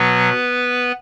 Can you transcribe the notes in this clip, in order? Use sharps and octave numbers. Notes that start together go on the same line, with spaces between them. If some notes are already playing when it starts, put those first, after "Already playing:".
Already playing: B2 F#3 B3 B4